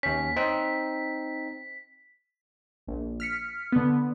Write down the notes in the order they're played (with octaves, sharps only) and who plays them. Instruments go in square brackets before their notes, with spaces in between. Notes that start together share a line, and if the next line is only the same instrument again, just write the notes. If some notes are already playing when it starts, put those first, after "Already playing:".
[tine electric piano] D#2 C#4 [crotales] B6
[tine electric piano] C4 D#4
[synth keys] A#1
F6 B6 C#7
D3 B3